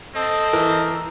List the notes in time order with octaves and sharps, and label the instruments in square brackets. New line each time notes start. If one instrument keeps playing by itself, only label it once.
[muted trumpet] C4 [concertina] A4 D#5
[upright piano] E3 A#4